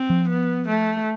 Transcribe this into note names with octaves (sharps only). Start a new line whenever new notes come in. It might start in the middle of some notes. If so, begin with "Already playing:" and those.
Already playing: C4
F3
B3
A3